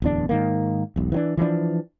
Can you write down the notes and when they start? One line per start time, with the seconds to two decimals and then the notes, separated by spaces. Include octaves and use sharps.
0.02 D1 E2 D4
0.29 G#2 D#3 A#3
0.96 E1 B1
1.12 E3 F#3 D4
1.37 E3 F3 G#3 D4